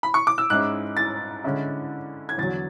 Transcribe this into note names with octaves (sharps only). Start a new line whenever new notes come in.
B5
C#6
D6
E6
G#2 G#3 C#4 E4 F#6
A6
D3 G#3 C#4 E4
G#6
E2 D3 F#3 A6